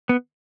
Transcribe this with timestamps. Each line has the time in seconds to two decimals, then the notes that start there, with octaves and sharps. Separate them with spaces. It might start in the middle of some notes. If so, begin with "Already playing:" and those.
0.09 B3